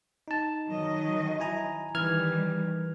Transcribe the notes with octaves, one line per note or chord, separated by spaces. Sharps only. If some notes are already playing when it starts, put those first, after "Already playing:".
D#4 A5
D#3 F#3 D#5
E4 G#5 A#5
D#3 E3 G3 F6 G#6